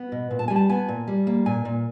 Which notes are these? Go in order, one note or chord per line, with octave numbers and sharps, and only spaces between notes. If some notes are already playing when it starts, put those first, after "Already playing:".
Already playing: B3
B2
A#2
A5
G3 G#5
A5
B3 G#5
A#2
G3
A#3
A#2 G#5
A#2